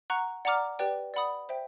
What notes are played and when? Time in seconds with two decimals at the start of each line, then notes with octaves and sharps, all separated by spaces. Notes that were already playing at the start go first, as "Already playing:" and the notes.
0.10 F#5 A#5 C#6 F#6
0.45 D5 F#5 A#5 D6 F6
0.79 G4 B4 D5 G5
1.14 D5 F#5 B5 D#6
1.49 C5 E5 G5